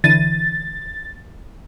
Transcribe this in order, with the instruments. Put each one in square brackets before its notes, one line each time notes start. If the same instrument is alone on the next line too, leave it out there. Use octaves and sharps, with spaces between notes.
[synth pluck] D3 E3 D#7 [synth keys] A6